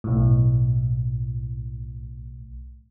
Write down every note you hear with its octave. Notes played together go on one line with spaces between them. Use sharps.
B1 A2